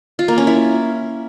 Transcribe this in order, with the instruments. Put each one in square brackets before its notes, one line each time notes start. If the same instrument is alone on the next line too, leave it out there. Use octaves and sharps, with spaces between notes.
[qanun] F4
A#3
C#4
E4